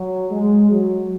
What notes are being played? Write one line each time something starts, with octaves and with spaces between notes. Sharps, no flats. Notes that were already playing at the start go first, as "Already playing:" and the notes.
Already playing: F#3
G#3
F#3